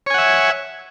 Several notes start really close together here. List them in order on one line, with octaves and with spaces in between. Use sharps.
C#5 G#5 F#5 E5